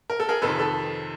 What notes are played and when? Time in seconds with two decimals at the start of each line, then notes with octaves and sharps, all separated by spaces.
0.10 A#4
0.20 A4
0.29 G#4 A#4
0.42 F2 C3 D#3 A4 B4
0.59 A4 B4